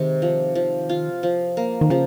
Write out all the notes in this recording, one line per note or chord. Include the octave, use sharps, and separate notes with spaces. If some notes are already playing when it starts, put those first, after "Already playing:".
Already playing: C3 D#3 G#3
F3
F3
F4
F3
A#3
D#3
C#3 F3